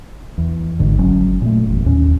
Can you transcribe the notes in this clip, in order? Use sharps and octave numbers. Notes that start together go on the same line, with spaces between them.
E2
G#1 G#2 D3
F#1 F#3 C#4
A#2 A3
F#1 E2
D#2 A2 C#4